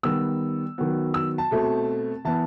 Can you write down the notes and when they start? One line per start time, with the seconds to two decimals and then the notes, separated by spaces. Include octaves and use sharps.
0.03 D#3 G3 B3 E6
0.78 D#3 F#3 B3
1.14 E6
1.38 A5
1.51 B2 A3 C4
2.25 E3 B3 A5